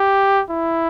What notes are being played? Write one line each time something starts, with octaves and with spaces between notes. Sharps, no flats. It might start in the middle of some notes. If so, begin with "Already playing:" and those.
Already playing: G4
E4